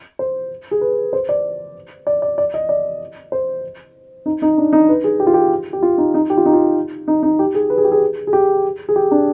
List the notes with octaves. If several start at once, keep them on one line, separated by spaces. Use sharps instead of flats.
C5
G#4
B4
C5
D5
D5
D5
D5
D#5
D5
C5
D#4
D#4
D4
D#4
B4
G#4
G4
F4
G4
G4
F4
D#4
D#4
G4
F4
D#4
F4
D#4
D#4
G4
G#4
B4
G#4
G4
G#4
G#4
G4
G#4
G4
D4